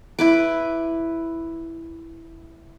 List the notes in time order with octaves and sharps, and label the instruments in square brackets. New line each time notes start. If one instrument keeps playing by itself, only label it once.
[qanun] E4 B4 D6